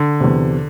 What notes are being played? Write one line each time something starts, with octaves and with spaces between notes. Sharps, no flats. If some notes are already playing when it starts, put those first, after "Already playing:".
Already playing: D3
E2 C3